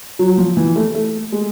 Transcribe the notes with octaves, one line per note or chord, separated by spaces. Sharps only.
F#3
F3
E3
A3
A3
G#3